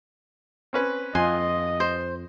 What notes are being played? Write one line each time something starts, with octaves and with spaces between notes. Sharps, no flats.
C4 C#4 B4
F2 F4 D#5 G#5 C6 F#6
C5